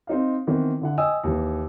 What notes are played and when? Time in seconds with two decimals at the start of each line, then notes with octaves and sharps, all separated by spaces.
0.07 C4 D#4 F5
0.47 D#3 E3 B3 C4
0.81 D3 E4 F#5
0.98 D#5 G5 G#5 D#6 E6
1.24 D#2 E3